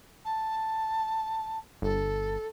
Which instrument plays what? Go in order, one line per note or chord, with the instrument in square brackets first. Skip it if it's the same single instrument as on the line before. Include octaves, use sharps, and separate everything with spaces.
[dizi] A5
[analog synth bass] G1 [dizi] A4